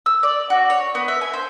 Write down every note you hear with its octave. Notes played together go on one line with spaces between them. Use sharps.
E6
D5
F#4
C#5
B3
E5
G#5
C5